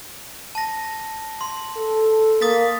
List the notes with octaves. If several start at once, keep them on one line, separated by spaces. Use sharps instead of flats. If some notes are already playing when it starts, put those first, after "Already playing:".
A5 A#6
C6
A4
A#3 D#6 A6 B6